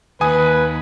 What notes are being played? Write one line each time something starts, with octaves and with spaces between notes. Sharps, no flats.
D#2 B4 G#5 D#6